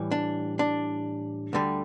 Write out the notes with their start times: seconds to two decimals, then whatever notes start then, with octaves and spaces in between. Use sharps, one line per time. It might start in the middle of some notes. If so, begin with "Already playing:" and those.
Already playing: A2 E3 G3
0.11 D4
0.59 D4
1.53 D2 D3 G3